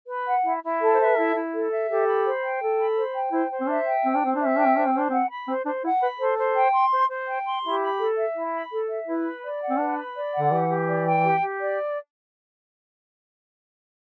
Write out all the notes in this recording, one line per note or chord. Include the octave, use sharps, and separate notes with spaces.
B4
F#5
E4
E4
A4
C5 E5
B4
E4 A4
E4
A4
E5
G4 A4
B5
C5
G5
A4
B5
C5
G5
E4 C5
C5
C4
D4 E5
G5
C4 C5
D4
C4 C5
D4 E5
C4
D4 G5
C4
D4 C5
C4
C5
D4
C4 F#5
B5
C4 C5
D4 C5
E4 F#5
B4 B5
A4 C5
C5
G5
C6
C5
C5
G5
C6
E4 G4
B5
A4
E5
E4
B5
A4
E5
E4 B4
B5
D5
F#5
C4
D4 B4
B5
D5
F#5
D3
E3 G4
G4
D5
G5
G4
G4
D5